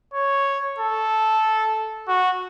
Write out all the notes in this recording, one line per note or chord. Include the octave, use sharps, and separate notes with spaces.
C#5
A4
F#4